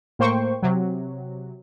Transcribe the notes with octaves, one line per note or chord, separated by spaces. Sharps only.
A2 A#3 C5 G5 C#6
C3 F#3